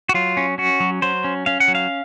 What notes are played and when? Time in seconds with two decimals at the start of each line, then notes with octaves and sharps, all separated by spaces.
0.09 F#4
0.14 F#3 F4
0.37 C#4
0.58 C#4 F#4
0.80 F#3
1.02 F#3 C5
1.24 C#4
1.46 C#4 F5
1.60 F#5
1.68 F#3
1.75 F5